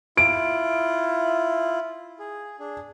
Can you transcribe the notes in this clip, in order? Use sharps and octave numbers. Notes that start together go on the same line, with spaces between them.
E4 F4 D7
G#4
D4 G#4